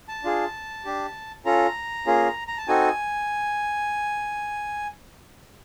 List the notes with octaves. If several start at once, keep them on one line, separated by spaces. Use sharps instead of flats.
A5
D4 F4 G#4
D4 G4
C#4 F4 A4 A#5
A#3 C#4 F4 G#4
A#5
A5
C4 D#4 F#4 A4 G#5